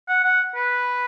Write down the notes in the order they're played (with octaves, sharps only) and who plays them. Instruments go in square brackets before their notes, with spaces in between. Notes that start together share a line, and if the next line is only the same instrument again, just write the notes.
[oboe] F#5
F#5
B4